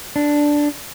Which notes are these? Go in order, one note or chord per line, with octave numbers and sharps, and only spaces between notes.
D4